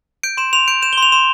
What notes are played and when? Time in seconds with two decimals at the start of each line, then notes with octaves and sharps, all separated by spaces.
0.23 G6 D7
0.37 C6 E7
0.53 C6 F7
0.68 G6 D7
0.82 G6 E7
0.93 G7
0.98 C6
1.03 F7
1.12 C6 E7